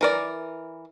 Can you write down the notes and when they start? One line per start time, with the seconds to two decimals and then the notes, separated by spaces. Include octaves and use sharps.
0.01 E3 A#4 D5